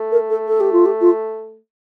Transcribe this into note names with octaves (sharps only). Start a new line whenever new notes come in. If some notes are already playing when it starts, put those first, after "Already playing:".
Already playing: A3
A#4
A4
A4
G4
F4
G4
F4